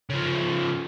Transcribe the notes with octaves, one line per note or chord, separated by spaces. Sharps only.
C#3 F3